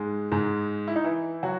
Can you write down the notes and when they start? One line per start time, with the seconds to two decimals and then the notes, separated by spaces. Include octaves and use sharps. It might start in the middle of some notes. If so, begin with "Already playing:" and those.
Already playing: G#2 G#3
0.32 G#2 G#3
0.88 E4
0.96 D#4
1.04 E3 E4
1.43 F#3 F#4